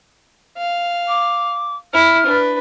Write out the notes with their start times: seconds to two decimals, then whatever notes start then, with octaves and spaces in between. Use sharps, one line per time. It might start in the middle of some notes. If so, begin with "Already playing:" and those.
0.58 F5
1.08 D6
1.94 E4 F6
2.26 D4 B4